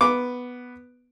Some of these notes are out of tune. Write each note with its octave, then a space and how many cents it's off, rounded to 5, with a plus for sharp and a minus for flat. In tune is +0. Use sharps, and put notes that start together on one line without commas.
B3 +0 D6 +0